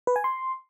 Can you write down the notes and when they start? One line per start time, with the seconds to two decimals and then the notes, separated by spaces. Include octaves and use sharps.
0.07 B4
0.16 G#5
0.24 C6